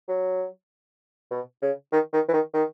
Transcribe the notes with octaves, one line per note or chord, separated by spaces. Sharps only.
F#3
B2
C#3
D#3
D#3
E3
D#3
D#3